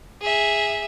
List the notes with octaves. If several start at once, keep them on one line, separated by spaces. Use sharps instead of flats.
G#4 E5